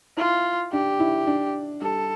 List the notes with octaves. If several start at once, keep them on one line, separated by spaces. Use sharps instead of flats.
E4 F4
D4 G4
E4
D4
G3 A4